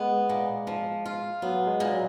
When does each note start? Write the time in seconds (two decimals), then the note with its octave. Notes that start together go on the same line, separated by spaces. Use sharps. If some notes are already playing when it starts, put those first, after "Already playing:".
Already playing: G#3 B3
0.29 A#2
0.67 F3
1.05 F4
1.42 F#3 B3
1.67 G#3
1.80 A#2
1.93 F#3